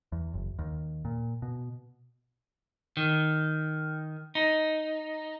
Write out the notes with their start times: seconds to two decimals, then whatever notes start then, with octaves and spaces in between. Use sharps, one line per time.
0.12 E2
0.34 F#1
0.59 D#2
1.05 A#2
1.42 B2
2.97 D#3
4.35 D#4